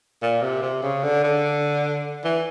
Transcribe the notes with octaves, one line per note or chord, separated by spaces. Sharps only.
A#2
C3
C3
C#3
D3
D3
E3